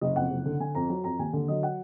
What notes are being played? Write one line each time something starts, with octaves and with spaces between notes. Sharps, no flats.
F#1 D#5
F2 F#5
F#1
D3
D3 G#5
F2 A#5
F#3 A#5
F2 A#5
D#2 G#5
D3
F#3 D#5
F#5